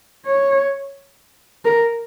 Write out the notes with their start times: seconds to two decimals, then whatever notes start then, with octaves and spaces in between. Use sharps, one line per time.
0.26 C#5
1.65 A#4